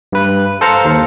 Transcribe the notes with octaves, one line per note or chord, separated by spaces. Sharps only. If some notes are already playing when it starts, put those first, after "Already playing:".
G2 B4
A4 C5 F5 A#5 C#7
D#2